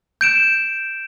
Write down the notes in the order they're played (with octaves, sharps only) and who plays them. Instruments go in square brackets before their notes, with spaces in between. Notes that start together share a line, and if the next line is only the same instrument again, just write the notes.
[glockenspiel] G6 D7 E7